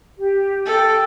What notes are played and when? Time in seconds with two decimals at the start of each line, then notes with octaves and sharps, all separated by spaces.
0.19 G4
0.66 A4 G5